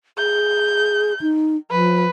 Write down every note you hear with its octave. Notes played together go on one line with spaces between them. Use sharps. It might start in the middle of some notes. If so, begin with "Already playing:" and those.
G#4 G6
D#4
F3 B4